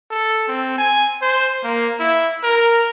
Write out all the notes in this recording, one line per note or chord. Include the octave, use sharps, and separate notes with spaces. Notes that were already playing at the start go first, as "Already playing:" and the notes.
A4
C4
G#5
C5
A#3
E4
A#4